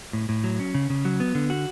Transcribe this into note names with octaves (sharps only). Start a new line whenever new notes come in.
A2
A2
F#3
C#4
C#3
C#3
F#3
B3
D3
F#4